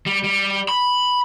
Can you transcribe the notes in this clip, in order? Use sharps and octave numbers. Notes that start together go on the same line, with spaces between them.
G3
G3
B5